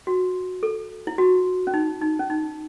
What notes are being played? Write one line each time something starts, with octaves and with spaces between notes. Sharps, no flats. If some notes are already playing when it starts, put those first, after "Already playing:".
F#4
A4
E4
F#4
C#4
D#4
D#4
C#4
D#4